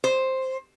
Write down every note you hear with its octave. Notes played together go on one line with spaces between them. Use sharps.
C5